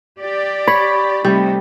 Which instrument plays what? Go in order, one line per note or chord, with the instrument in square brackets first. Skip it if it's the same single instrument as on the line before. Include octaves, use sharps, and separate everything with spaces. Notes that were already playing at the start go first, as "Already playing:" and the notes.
[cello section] G4 D5
[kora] C#5 [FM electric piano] B5
[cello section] C3 A3 D#4 [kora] G3